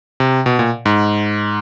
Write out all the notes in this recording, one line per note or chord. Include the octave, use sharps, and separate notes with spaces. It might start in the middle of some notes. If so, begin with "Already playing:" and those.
C3
B2
A#2
G#2